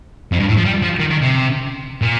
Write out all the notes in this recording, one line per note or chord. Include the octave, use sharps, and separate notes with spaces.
F2
G2
A2
F3
G3
F3
D#3
D#3
C3
A#2